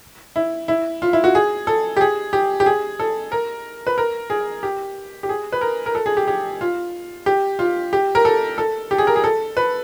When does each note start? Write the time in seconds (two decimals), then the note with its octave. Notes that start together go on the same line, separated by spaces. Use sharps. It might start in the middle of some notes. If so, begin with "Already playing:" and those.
0.36 E4
0.68 E4
1.02 F4
1.13 E4
1.24 F#4
1.35 G#4
1.67 A4
1.97 G4
2.01 G#4
2.33 G4
2.60 G4
2.66 G#4
2.99 A4
3.32 A#4
3.87 B4
3.98 A#4
4.30 G#4
4.63 G4
5.23 G4
5.29 G#4
5.52 B4
5.61 A#4
5.86 A#4
5.95 A4
6.06 G#4
6.17 G4
6.28 G4
6.61 F4
7.26 G4
7.59 F4
7.93 G4
8.15 A#4
8.25 A4
8.58 A4
8.91 G4
8.98 G#4
9.07 A#4
9.16 G#4
9.24 A4
9.57 B4